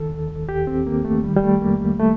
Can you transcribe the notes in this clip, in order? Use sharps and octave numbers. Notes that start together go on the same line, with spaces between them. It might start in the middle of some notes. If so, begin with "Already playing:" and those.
Already playing: D#3 A4
D#2
D#2 G4
C4
D#3 A#3
A3
D#3 G3
G3
A3
F2 A#3
A3